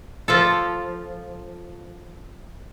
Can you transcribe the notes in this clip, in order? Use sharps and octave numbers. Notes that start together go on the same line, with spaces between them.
F3 F4 A4